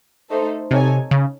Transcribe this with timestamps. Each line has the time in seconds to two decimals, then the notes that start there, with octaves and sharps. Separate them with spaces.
0.30 A3 D#4 A4 C5
0.71 C3 D#4 A4 C#5 G#5
1.11 C#3